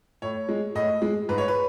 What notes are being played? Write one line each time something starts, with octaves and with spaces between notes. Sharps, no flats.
A2 C#5
G#3
A2 D#5
G#3
G#2 B4
C#5
B4